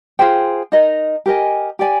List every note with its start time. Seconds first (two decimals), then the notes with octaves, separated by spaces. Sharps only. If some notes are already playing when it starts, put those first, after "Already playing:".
0.19 F4 G#4 C5 G5
0.72 D#4 A#4 D#5
1.26 G4 A#4 D#5 G#5
1.79 G4 D5 G#5